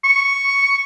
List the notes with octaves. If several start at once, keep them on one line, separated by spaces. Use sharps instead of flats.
C#6